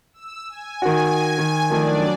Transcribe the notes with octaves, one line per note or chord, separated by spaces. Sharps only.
E6
G#5
D#3 F#4
D#3
F#2 D#3 F3 A3 D4 D5